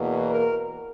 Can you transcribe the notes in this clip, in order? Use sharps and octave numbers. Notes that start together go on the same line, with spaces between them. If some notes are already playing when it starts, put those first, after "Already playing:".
Already playing: E2 B2 A#3
A#4